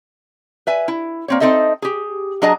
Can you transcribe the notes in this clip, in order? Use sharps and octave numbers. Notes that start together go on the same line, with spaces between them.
B4 E5 G#5
E4
A#3 C4 C#5
C4 D#4 A4 D#5 E5
G4 G#4
F#3 D4 G#4 D#5 A5 A#5